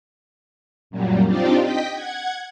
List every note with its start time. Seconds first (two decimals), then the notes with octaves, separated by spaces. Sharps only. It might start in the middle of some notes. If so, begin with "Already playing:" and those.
0.90 F#2 A#2 F#3 G3
1.26 C4 D4 D#4 F4 G4 D5
1.61 D#5 G5 B6
1.92 F#5 G#6